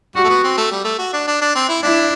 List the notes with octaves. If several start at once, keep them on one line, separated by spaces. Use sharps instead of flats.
G3 F#4
A3
B3
C4
A3
G3
A3
F#4
D4
D4
D4
C4
E4
D4 E4